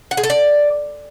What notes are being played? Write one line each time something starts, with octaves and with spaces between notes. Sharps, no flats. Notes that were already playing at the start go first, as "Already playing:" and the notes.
F#5
G#4
A4
D5